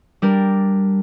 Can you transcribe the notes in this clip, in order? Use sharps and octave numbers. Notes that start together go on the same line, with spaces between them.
G3 D4 A#4